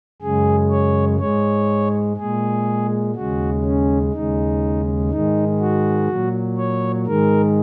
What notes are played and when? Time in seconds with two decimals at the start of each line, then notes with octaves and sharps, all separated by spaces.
0.22 F#2 C#3 G#3 G#4
0.71 C#5
1.20 G#2 G#3 C#5
2.17 A#2 G#3 G#4
3.15 D#2 C#3 G#3 F#4
3.64 C#4
4.13 D#2 C#3 G#3 D#4
5.10 G#2 D#3 G#3 D#4
5.60 F#4
6.08 A#2 F#3
6.57 C#5
7.07 G#2 D#3 G#3 A#4